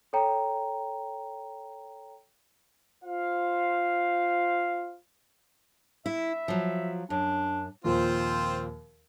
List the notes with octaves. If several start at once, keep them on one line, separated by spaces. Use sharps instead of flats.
A4 C#5 G5 A#5
F4 C5 F5
E4 E5
F3 F#3
F#2 D4
D#2 A#2 F3 C4 F4 C5